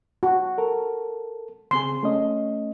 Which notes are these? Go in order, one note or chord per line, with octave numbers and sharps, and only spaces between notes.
F#4
A4 A#4
C#3 C4 G#4 C6
A3 C#4 D#5